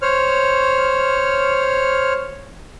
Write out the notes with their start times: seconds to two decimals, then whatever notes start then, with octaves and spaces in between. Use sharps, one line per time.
0.02 C5 C#5 F6